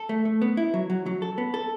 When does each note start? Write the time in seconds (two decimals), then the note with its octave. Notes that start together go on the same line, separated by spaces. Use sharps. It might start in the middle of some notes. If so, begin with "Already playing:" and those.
Already playing: A4
0.09 A3
0.25 A3
0.42 B3
0.57 E4
0.74 F#3
0.90 F#3
1.06 F#3
1.22 A4
1.38 B3
1.54 A4